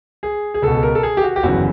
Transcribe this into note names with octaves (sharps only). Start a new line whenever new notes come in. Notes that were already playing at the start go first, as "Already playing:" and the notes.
G#4
G#4
C#2 B2 A4
A#4
A4
G#4
G4
F#4
G4
G1 F#2 C#3 E3 F#4